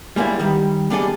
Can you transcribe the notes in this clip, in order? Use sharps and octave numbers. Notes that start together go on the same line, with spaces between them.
G3 G#3 A#3 B3 E4
D#3 G3
G3 B3 D4 G#4 A4 D#5